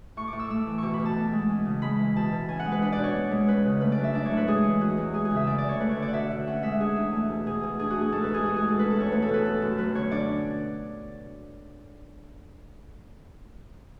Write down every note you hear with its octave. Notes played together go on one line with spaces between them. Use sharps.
A2 C#6
D6
A2
E6
A3 E6
E3
B2 C#6 D6
B5
B2
A5
B3
G#3
C#4
C#3
G#3 B5
E3
B2 A5
B2
C#4 G#5
F#5
G#3
B4
D4 B4
D5
B2 C#5
B3
G#3
C#4 B4
C#3
A3 B4
D5
F#3
E5
D4 D5
C#5
A2
B4
G#3 G#4
E3
E2 F#4
E2
G#3 G#4
G#4
C#3
E5
D2 D5
D5
D2 C#5
A3 B4
C#5
D3
D5
F#5
B2 E5
B2
C#4 F#5
G#3 E5
D4 G#4
E2
A3
B2
B2 G#4
B2
D4 G#4
F#4
A3
G#4
G#2 A4
B4
G#2
G#4
B3 F#4
G#4
G#3
A4
C#4 B4
A4
E2 C#5
A3 B4
A4
B2
B4
B3 A4
F#2
F#3 B4
D3 C#5
D4 D5